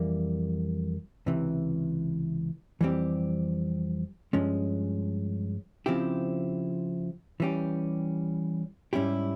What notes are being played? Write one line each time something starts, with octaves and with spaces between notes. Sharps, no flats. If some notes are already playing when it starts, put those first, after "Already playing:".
Already playing: F2 E3 G3 A#3
C#2 C3 E3
F2 E3 G3 C4 G4
G2 F3 G#3 C#4
C#3 F3 C4 E4 G4
E3 G3 C#4 G4
G#2 G3 C#4 E4 G4